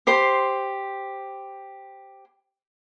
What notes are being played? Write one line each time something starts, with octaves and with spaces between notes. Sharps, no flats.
G4 C5 C6